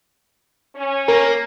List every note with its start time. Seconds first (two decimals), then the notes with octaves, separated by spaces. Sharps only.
0.75 C#4
1.08 A#3 A#4